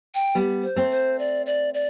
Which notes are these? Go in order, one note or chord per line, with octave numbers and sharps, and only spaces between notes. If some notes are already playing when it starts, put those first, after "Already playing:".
G5
G3 B3
C5
A3 C4
C5
D5
D5
D5